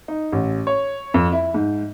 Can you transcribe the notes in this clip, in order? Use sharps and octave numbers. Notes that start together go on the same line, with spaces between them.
D#4
A1
C#5
F2
E4
G#2